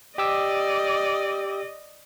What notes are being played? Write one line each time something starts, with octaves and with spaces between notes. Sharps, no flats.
G4 D5 D#5 D6 E6